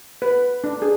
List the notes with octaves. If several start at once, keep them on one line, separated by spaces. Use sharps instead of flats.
B4
D4
G#4